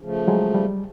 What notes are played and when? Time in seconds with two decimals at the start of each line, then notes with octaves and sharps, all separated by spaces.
0.01 C#3 F3 A3
0.28 F#3 G#3
0.55 G3